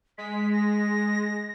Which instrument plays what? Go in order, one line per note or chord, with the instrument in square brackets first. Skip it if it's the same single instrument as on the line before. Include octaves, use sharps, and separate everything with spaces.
[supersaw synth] G#3 [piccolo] B6
[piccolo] A#6